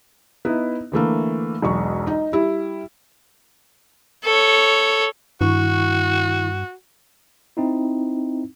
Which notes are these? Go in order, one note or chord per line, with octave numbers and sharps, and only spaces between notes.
B3 D#4 E4
D3 E3 A3 A#3
E1 B1 C#6
D#4
G3 E4
A4 C#5
G2 D#3 E4 F#4 C#6
C4 D#4 E4